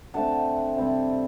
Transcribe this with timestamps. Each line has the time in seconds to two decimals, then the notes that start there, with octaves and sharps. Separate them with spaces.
0.14 D3 A3 C4 F#5 A5
0.77 C3 G3 C4